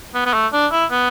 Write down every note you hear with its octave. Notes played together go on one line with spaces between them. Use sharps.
B3
B3
A3
D4
E4
B3